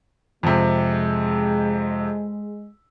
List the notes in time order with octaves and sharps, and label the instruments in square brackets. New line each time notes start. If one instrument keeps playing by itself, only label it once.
[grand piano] F2 C3 [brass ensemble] G#3